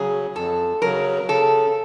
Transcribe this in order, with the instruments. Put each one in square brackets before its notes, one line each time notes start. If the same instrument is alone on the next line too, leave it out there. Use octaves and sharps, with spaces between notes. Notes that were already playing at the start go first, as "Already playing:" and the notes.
Already playing: [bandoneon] C#3 F#3 [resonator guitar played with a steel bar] G#4
[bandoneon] F2 [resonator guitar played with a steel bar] A4
[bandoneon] C#3 F#3 [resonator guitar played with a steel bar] A#4
[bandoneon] C#3 [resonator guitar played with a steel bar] A4